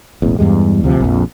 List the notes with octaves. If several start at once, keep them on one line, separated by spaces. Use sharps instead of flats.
E1 A1 E2
E2 G2 G3 G#3
D2 C3 F3
A#1 F2